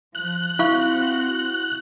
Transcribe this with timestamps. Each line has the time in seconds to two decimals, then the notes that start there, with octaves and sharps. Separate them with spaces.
0.15 F3 F#6
0.59 C4 E4 F#4 F5 C#6